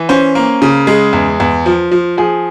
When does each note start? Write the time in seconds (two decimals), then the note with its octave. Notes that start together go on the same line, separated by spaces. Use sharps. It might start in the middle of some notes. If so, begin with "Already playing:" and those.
Already playing: E3
0.09 C#4 C5
0.35 A#3
0.62 C#3
0.87 G#3
1.13 E2
1.40 E2
1.66 F3
1.91 F3
2.17 F3 G#4